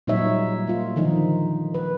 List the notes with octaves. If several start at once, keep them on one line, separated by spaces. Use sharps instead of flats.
A#2 F#3 G3 D#4 C#5 E5
A#3 F4
D3 D#3 F3 D#4
B4